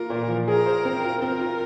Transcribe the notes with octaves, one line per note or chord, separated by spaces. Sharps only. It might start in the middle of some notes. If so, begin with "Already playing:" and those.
Already playing: A#3 F4 A#4
A#2
F3
G#4 A#4
C5
C4
F4
C4 A#4
F4